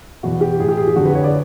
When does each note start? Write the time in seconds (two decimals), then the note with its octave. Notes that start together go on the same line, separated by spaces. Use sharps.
0.23 E2 B2 F#4
0.41 G4
0.59 A2 E3 G#4
0.68 G4
0.77 G#4
0.87 G4
0.96 F2 D3 F#4
1.05 B4
1.15 C#5
1.24 D5